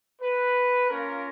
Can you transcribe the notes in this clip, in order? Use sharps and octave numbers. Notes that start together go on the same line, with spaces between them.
B4
A#3 C#4 F4 A#4